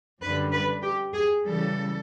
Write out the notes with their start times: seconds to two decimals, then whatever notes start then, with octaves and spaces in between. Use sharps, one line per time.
0.22 F#2 D3 G3 B4
0.52 B4
0.83 G4
1.14 G#4
1.44 C#3 E3 G3 A4